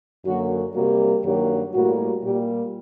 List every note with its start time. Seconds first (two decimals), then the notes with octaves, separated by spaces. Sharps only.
0.24 F#2 D3 F#3 A#3 F#4
0.74 C3 G3 A#3 F#4
1.23 G2 D#3 F#3 A#3 G4
1.74 A2 G3 A#3 F#4
2.23 A#2 G3 A#3 G4